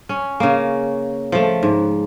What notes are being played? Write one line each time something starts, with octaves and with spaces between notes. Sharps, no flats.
C#4
C#3 A#3
F3 A3
G#2